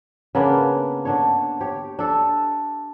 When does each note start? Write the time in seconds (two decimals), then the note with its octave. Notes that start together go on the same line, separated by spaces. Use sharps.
0.35 C#3 A#3 B3 D4
1.05 D3 D4 C#5
1.61 G4 C#5
1.99 D4 A4